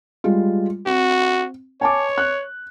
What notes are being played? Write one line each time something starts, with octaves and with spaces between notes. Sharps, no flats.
G3 G#3 F4
C4 F#4
C#5 G#5 A5 D6
F#6